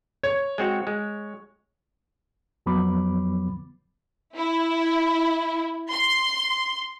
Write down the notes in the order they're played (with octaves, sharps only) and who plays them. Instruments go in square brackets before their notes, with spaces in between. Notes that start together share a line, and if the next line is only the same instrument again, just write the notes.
[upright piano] C#5
[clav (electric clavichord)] G#3 C4 F#4
G#3
[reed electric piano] F2 F3 F#3 B3 B5 D6
[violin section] E4
C6